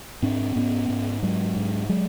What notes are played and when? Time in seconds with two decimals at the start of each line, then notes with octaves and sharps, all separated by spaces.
0.22 G#2 C4 D4
0.56 G#2 B3 C#4
0.90 G#2
1.22 G#2 F#3 G#3
1.56 G#2
1.89 F#3 G#3